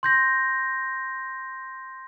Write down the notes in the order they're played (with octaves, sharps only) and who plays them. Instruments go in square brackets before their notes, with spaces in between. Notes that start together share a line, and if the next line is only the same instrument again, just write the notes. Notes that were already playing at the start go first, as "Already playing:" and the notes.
[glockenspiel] C6 G6 A#6